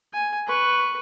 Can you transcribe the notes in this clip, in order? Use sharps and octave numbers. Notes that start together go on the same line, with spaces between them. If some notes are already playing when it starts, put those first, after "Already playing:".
G#5
B4 C#6